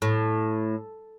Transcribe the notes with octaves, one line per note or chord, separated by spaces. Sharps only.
A2